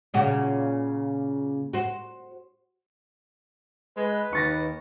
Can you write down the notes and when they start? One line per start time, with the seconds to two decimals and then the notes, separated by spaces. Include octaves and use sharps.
0.14 A#2 C#3 F#4
1.73 F#4 C5
3.97 G#3 B4
4.33 D#2 C#6 A6 A#6